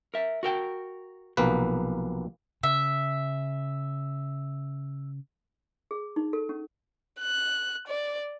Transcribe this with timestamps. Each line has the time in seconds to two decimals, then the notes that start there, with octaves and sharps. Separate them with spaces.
0.14 A#4 E5
0.43 F#4 A#4 G5
1.37 B1 C3 F3 A#3 B4
2.63 C#3 E5
5.91 G#4
6.16 D#4
6.33 A4
6.49 C#4
7.20 F#6
7.87 D5